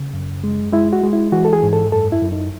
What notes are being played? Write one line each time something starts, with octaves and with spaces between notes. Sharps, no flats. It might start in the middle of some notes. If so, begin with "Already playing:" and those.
Already playing: C#3
F#2
G#3
G#3 E4
F#4
G#3
E4
E3 F#4
A4
G#4
G#2
A4
F#2 A4
E4
F#2
D#4